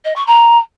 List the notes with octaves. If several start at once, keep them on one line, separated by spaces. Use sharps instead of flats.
D#5
C#6
A#5